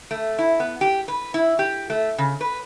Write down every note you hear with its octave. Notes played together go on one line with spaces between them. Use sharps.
A3
E4
B3
G4
B4
E4
G4
A3
C#3
B4